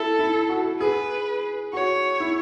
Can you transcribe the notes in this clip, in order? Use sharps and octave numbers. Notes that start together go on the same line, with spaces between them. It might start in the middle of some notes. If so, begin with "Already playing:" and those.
Already playing: E4 A4
E4
F#4
G#4 B4
F#4 C#5
E4